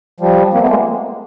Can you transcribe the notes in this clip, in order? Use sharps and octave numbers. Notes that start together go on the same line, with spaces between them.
F3 G3
A#3 C4
A3 B3
G#3 A#3